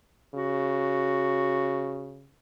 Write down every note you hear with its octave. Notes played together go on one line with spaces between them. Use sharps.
C#3 F#4